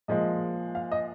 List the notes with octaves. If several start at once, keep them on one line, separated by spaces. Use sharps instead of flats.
A#2 F3 G#3 D#5
F5
D#5